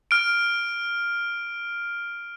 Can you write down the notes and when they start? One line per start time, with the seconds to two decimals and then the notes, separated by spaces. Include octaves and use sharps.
0.11 F6 D7